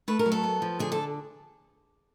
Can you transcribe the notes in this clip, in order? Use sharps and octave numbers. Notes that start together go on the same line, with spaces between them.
A3 B4
A#4
F#3
A4
B3
F3
D3 G#4
A4